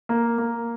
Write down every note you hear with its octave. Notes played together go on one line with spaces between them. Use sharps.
A#3
A#3